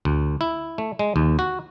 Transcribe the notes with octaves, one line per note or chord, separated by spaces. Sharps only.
D2
E4
A3
G#3
D#2
F#4